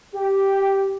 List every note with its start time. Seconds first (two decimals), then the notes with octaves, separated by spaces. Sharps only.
0.14 G4